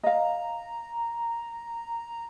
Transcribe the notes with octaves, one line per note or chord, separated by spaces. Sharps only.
D#5 F5 A#5